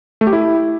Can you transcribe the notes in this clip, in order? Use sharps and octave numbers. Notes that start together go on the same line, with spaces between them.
A3
G4
E4